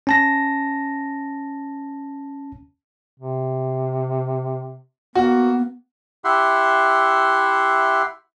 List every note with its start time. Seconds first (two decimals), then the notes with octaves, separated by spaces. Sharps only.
0.07 C#4 A5 A#6
3.19 C3
5.15 A#3 B3 F#4
6.25 E4 G4 E5 F#5 C6